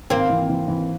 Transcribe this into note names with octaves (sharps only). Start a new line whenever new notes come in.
G#1 A#3 C4
E3
E3
E3